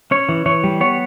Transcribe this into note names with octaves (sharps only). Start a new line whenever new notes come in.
C#4 C#5
E3
E3 C#5
G3
B3 C#5